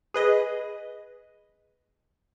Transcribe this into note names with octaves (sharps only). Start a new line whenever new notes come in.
G#4 B4 D#5